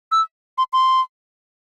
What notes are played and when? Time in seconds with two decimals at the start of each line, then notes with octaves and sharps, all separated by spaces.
0.12 E6
0.58 C6
0.73 C6